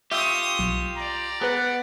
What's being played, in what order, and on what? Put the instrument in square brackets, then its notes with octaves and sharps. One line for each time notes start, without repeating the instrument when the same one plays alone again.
[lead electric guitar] F4 G4 [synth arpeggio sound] E5 E6 G6 [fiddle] C#6 D#6
[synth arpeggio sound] B1
[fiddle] D5 [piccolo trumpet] A#5
[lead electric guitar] B3 [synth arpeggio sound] G#4 B4 [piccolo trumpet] F#5